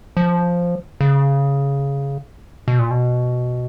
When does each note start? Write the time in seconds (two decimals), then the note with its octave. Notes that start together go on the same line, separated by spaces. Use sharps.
0.17 F3
1.01 C#3
2.68 B2
2.79 A#2
2.91 B2